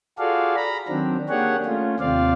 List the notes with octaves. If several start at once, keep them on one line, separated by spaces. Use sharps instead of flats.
F4 F#4 G#4 A4 D5 F5
A#5 B5
D#3 F#3 C4 D4
A#3 D4 G4 G#4 C#5 F#5
A3 C#4 F4
D#2 C3 C4 F4 D5 F5